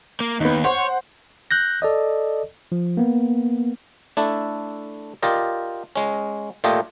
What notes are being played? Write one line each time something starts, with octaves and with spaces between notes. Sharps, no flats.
A#3
D#2 B3 D#4
C5 C#5 F#5 C6
F#6 G6 A#6
A4 D5 D#5
F3
A#3 B3
A3 D4 E4 A4
F4 G4 A#4 D5 D#5
G#3 C#4
A#2 A3 F4 G4 D#5